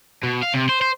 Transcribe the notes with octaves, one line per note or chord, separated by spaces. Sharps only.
B2
F5
C3
C5
C5